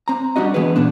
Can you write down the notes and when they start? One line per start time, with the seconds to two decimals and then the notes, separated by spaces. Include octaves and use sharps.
0.08 C4 A#5
0.36 G3 D4 F#4 D#5
0.54 D3 E3 G#3 B3 G#4 B4
0.76 A#2 D3 B3 D4